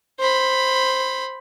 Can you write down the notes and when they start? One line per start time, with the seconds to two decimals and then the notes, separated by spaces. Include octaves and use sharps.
0.19 C5 B5